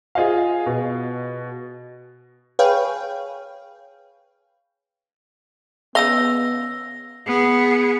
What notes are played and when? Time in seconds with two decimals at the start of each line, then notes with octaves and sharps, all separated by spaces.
0.15 F4 G#4 C5 D#5 F5
0.66 B2
2.59 G#4 B4 C#5 F5 G5
5.95 C#3 B3 D#5 F5 E6 A#6 G7
7.27 B3 G#4